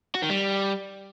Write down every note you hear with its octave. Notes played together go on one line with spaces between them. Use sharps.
F#4
D#3
G3